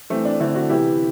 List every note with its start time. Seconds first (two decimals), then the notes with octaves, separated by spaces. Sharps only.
0.10 E3 A3 C4
0.25 D4
0.40 D3 A3 C4 E4
0.54 D4 F#4
0.69 C3 E3 B3 E4 G4